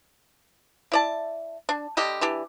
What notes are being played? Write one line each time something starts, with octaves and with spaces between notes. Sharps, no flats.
E4 D5 A5
D4
D3 G3 G4 D#5
E3 D4 G4